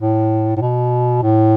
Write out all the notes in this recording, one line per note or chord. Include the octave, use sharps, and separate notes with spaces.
A2
A2
B2
A2